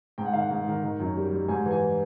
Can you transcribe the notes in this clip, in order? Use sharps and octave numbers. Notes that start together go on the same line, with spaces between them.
G#2 G5
F#5
D#3 F5
F#5
G#2
D#3
D#3
F#2
G3
G3
G#2 G#5
E3
G#5